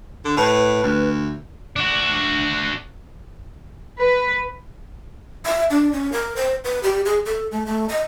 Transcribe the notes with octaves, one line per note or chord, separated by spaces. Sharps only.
D3
A2 B4
D2
D4 F#4
B4
E5
D4
C#4
A#4
C5
B4
G4
G#4
A4
A3
A3
D#5